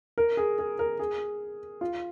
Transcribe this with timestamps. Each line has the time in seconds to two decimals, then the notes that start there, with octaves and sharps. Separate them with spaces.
0.18 A#4
0.37 G#4
0.58 G#4
0.79 A#4
0.99 G#4
1.81 F4